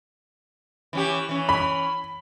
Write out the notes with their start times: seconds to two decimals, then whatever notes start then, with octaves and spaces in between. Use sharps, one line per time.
0.93 E3 C#4 G4
1.29 E3 C#4
1.49 B5